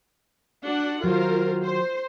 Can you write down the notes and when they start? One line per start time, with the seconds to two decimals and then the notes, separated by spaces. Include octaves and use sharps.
0.65 D4 F#4 F#5
1.03 D#3 F#3 F4 A#4 C5
1.63 C5